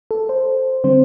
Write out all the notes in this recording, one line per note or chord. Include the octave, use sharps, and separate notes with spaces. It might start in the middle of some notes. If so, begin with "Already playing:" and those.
A4
C5
D3 G3 C4 C5